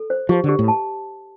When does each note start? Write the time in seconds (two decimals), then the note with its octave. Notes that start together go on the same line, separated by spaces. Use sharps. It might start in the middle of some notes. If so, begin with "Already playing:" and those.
Already playing: A4
0.10 C5
0.29 F3 G4
0.44 D3
0.49 G4
0.59 A2
0.68 A5